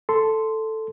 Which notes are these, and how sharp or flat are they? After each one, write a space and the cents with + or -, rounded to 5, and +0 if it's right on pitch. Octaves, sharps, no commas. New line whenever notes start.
A4 +0 C6 -10